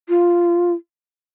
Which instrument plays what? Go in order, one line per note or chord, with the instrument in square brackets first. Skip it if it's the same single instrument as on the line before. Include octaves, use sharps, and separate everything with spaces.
[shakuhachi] F4